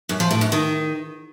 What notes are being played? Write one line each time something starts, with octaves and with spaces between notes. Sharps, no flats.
F#2
F3
A2
F#2
D#3